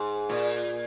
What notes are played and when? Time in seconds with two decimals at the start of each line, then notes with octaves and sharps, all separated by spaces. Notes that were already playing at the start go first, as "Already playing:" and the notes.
Already playing: G#2
0.29 A#2